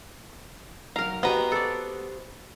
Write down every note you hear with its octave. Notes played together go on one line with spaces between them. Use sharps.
F#3 D#4 A#4 F5 A#5
B3 F#4 G4 C5 D#5 A#5
A4 D5